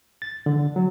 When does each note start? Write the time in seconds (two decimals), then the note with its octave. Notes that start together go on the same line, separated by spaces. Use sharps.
0.22 A6
0.46 D3
0.76 F#3